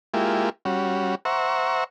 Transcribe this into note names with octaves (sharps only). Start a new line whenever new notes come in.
G#3 A#3 E4 F4 G4
G3 C#4 F#4
C5 E5 F#5 A#5 C#6